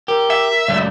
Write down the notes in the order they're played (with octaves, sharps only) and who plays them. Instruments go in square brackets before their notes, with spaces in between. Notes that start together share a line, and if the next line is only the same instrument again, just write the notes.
[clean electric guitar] G4 [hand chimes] A#4
[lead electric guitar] E5
[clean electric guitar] C#2 F#2 A3 [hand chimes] D5